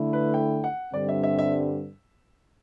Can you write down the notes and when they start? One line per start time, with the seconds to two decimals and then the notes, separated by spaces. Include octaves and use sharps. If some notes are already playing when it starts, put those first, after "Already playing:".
Already playing: D3 A3 E4
0.13 B4
0.34 G5
0.64 F#5
0.93 G2 D3 G3 C4 D5
1.09 E5
1.24 E5
1.39 E5